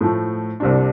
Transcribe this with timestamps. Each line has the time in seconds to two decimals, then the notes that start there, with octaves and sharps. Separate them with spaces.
0.01 A2 F3 A3
0.60 C2 C3 G3 D4